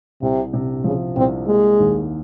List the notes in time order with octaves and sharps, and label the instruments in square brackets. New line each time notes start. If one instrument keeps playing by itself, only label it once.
[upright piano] C2 [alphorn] C3
[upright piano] C3
[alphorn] C#3 [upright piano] F3
[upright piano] C2 [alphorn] C4
[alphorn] G#3 [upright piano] A#3
[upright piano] D#2